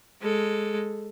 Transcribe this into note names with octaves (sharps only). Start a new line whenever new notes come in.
G#3 A4